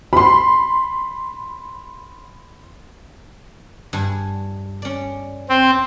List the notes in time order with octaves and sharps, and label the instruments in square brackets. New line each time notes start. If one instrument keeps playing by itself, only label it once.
[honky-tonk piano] B5 C6
[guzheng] G2 G#5
C#4 D5
[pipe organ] C4